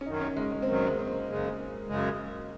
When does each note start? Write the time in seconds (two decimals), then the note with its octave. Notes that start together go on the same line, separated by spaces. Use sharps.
0.01 C#4
0.06 F#2 D#3 F#3 D#4
0.21 C#4
0.37 G#3
0.52 G#3
0.62 C4
0.66 F#2 D#3 F#3 A#3
0.87 G#3
0.99 C4
1.07 A#3
1.28 F#2 C#3 G#3
1.88 F#2 C#3 G#3